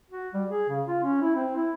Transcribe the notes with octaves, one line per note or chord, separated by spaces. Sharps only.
F#4
G3
G#4
C#3
F4
C#4
E4
C4
E4